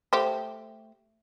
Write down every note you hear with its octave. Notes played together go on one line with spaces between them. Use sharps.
A3 G4 C5